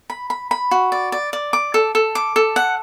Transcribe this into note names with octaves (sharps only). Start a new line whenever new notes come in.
B5
B5
B5
F#4
D5
D5
D5
D6
A4
A4
D6
A4
F#5